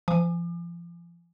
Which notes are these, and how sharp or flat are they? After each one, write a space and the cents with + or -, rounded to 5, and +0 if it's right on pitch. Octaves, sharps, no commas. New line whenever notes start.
F3 -35 G#5 +0 D6 +40